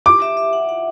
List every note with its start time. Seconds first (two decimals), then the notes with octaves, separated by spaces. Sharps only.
0.06 G4 D6
0.22 E5
0.37 E5
0.53 F#5
0.69 F#5